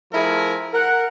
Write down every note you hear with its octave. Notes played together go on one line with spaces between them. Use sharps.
F3 A3 E4 G#4 A#4
A#4 F#5